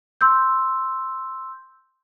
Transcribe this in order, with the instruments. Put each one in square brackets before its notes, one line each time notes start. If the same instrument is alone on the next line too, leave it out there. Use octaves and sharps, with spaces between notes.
[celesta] C6 E6 G6